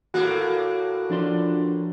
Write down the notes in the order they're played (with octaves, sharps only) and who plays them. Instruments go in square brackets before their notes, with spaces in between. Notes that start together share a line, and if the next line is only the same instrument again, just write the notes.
[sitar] A2 A#3 [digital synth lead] F#4
[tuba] F3 [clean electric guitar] D4 D5 C6